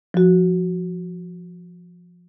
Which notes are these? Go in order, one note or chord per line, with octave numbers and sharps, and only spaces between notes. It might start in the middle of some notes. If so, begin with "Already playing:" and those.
F3 F#4